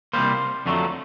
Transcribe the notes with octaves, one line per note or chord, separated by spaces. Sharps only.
C2 B2 G3 A#3 C5
F2 D3 F#3 A3